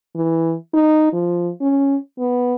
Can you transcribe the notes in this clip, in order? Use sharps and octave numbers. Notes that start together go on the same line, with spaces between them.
E3
D#4
F3
C#4
B3